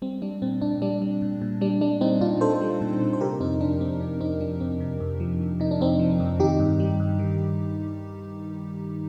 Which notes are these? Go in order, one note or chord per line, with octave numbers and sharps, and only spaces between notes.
G3 C4
G3 D4
A#2 C4
A#2 D4
G3 D4
G3
A#2
A#2
G3 D4
G3 D4
A#2 C4 D#4
A#2 D4 F4
G3 A4 C5
G3
A#2
A#2
C5
C3 G4 A#4
F2 C4 D#4
F3 D4
F2 C4
C3 D4
F2 C4 D#4
F3 D4
F2 C4
C3
F2
F3
F2
C3 D#4
D4
F2 C4 D#4
F3
F2
D#3 D#4 G4
G2
G3
G2
D#3